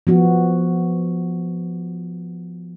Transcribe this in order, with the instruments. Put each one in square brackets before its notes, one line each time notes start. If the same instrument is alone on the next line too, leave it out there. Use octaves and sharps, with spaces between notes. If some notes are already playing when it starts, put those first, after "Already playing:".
[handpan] F3 B3 F#4